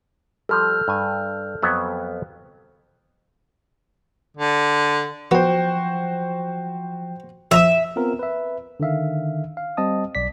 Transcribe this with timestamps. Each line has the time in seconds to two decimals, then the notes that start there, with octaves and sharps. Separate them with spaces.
0.49 F3 G3 A4 F6 G6
0.88 G2 G#5
1.62 F2 F#3 B3
4.37 D3
5.31 F3 B3 F#4 C5 G5
7.51 F2 E5 A#5 D#6
7.96 B3 C4 F4 A#4
8.19 B4 E5
8.80 D3 D#3 E5 F5
9.57 F5
9.77 G3 C4 D#5 A5 D#6
10.15 B1 D5 B6